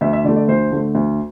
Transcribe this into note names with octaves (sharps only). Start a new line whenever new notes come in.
D2 E5
E5
D3 A3 D5
D5
D2 C5
D3 A3
D2